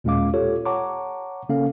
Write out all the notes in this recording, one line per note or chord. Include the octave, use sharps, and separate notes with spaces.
D#2 A#2 G#3 C#4 F5 D6
F4 G4 A4 C#5
C#5 F#5 A5 A#5 C#6 D6
C#3 A#3 C#4 A4 F5